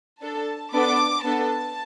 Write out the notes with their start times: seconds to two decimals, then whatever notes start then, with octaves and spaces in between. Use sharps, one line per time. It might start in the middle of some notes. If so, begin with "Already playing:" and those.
0.21 D4 A4 A5
0.73 B3 D4 A4 D6
1.24 B3 D4 A4 A5